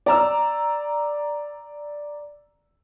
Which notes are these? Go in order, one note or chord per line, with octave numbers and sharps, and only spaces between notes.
D5 A#5 E6